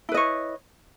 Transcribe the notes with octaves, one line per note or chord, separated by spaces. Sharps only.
E4 B4 C#5 D#5